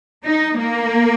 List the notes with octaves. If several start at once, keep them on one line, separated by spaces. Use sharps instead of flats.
D#4
A#3